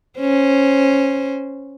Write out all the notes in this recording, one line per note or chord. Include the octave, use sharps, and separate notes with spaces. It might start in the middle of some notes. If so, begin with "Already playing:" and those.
C#4 C5